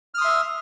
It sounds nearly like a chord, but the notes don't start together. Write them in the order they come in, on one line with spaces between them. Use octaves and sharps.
F6 D#6 C6 E5